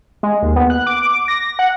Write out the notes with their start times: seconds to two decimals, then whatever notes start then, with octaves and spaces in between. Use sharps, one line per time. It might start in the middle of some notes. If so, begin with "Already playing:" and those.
0.23 G#3
0.42 D#2
0.56 B3
0.70 F#6
0.87 D6
1.09 D6
1.28 A#6
1.59 F#5